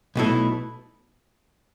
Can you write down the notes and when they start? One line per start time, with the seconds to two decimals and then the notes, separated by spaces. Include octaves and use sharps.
0.16 B1 B2 A3 E4